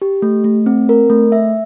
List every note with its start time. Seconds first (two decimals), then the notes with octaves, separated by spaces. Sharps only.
0.02 G4
0.22 A3
0.44 A3
0.66 C4
0.89 A#4
1.10 A3
1.32 E5